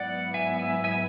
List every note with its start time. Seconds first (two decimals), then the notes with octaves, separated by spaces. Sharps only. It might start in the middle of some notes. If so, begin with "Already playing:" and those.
Already playing: G#2 F#3 B3 E4 D5 F#5
0.34 E5 G#5
0.59 E5 G#5
0.84 E5 G#5